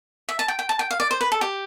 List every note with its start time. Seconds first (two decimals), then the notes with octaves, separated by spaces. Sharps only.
0.29 E5
0.39 A5
0.48 G5
0.59 G5
0.69 A5
0.79 G5
0.91 F5
1.00 D5
1.11 C5
1.21 B4
1.32 A4
1.41 G4